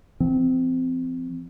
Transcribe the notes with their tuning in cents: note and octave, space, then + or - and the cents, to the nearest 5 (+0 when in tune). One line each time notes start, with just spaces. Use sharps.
F3 -35 C4 -20